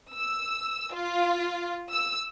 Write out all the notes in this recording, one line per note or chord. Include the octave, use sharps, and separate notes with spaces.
E6
F4
E6